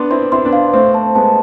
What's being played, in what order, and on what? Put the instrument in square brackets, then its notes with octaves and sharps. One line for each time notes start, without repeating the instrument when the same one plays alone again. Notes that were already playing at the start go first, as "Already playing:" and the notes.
Already playing: [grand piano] B3 D4 [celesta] C6
[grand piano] C4 E4 [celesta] C6
[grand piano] C4 E4 [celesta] C6
[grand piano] B3 D4
[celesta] F5
[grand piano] A3 C4 [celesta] C5
[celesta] A5
[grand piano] G#3 B3 [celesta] A5